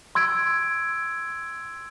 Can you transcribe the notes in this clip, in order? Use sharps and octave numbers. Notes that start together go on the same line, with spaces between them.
C6 E6 G#6 D7